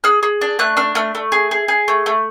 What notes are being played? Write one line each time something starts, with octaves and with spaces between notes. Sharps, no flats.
G#4 F6
G#4
D4
A3 F#6
D4 F6
A3 F6
A3
G#4
G#4
G#4
A3
A3